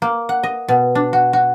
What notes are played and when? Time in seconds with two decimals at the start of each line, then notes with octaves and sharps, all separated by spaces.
0.02 A#3
0.29 F#5
0.43 D#5
0.68 B2
0.95 D4
1.13 F#4
1.33 F#4